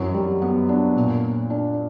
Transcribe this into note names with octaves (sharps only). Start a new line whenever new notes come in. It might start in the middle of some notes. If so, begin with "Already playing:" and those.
Already playing: F#2 E3 F#3
G3
B3
D4
A#2
D4